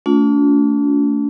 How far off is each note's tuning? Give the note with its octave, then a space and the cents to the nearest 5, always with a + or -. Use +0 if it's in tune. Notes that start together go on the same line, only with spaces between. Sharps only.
A3 +10 D4 -40 F4 +30